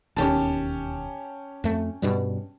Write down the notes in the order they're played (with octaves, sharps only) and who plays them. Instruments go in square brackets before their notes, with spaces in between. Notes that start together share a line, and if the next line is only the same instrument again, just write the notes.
[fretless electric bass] E1 D#2 [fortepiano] C#4 G4 A5
[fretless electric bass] F2 A3
G2 B2 G3